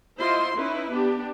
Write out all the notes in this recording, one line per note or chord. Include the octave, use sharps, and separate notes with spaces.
E4 F4 C5 D#5 C6
C#4 D#4 E4 B4
B3 D4 G4